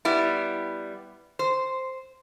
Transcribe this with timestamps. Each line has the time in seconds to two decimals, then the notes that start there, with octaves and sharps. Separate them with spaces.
0.05 G3 B3 E4
1.39 C5